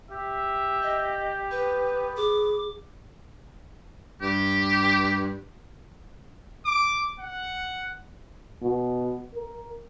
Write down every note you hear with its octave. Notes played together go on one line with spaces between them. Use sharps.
G4 E5
D#5
B3 B4
G#4 D6
G2 G4
D6
F#5
B2
A#4